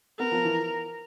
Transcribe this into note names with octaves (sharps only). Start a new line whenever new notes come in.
B3 A#4
F3
E3